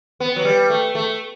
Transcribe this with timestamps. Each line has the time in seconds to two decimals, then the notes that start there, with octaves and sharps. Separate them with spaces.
0.20 B3
0.36 F#3
0.45 G3
0.70 A3
0.95 A3